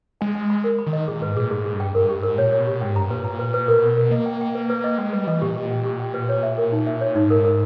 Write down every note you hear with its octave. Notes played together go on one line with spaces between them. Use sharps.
G#3 G#5
G#5
B5
A#4
B5
D#3
D#5
A#2 G#4
G#2 B4
A#2 G#4
G#2 G#4
G#4
G2
G5
G2 A#4
G4
G#2
A#4
A#2 C#5
C#5
B2
G4
G#2 G5
G2 A#5
A#2 B4
A#5
B4
B4
B2 A#4
A#4
A#4
A#3 D#5
G5
G5
B4
B4
D#5
G#3 G5
G3 B4
E3 D#5
A#2 G4
G4
G5
G4
G5
B4
C#5
E5
A#4
D#4
E5
C#5
G#2 D#4
A#4
A#4